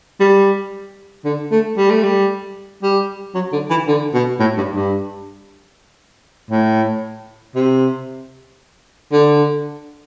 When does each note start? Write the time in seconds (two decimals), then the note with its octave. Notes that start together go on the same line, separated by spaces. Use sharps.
0.20 G3
1.25 D3
1.52 A3
1.78 G3
1.91 A3
2.03 G3
2.83 G3
3.35 F#3
3.53 D3
3.70 E3
3.88 D3
4.14 B2
4.40 A2
4.57 G2
4.75 G2
6.51 A2
7.55 C3
9.12 D3